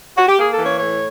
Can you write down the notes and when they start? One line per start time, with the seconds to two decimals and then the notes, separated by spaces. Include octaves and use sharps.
0.18 F#4
0.28 G4
0.39 A#3 G#4
0.53 A4
0.59 E3
0.66 C#5
0.79 A2 C#5